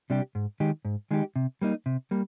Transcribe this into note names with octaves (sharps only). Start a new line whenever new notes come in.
C3 G3 D4 G4
G#2
D#3 G#3 D#4 G4
G#2
D#3 G#3 D#4 G4
C3
G3 A#3 D#4
C3
G3 A#3